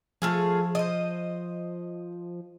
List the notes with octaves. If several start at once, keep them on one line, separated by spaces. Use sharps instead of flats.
F3 A3 F4 G#4
C5 D#5